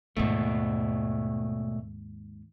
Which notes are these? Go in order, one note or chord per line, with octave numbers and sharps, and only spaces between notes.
D#2 G#2 B2 A3